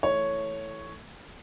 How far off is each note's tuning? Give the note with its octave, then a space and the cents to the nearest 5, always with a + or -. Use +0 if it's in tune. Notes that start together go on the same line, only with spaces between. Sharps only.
E3 -10 A3 +0 C#5 +0